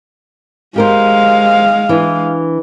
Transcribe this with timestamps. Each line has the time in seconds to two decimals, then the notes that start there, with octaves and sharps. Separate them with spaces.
0.76 G#3 G4 A#4 C5 F5
1.89 E3 D4